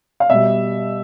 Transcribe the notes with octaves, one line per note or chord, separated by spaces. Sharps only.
F5
B2 G3 E5